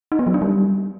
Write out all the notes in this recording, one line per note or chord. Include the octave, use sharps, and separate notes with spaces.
D#4
B3
F#3
D4
G3